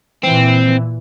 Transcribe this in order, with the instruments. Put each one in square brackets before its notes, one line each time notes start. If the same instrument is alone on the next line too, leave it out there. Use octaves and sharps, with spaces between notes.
[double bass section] A#2 E3 [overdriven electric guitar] C4